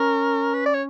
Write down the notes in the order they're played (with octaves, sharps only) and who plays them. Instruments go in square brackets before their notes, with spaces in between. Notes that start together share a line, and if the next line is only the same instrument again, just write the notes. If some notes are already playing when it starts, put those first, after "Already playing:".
Already playing: [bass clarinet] C#4 [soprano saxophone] A#4
[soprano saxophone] B4
D5
C#5